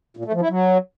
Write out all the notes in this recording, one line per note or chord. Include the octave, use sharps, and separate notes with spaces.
A#2
A3
F3
E4
F#3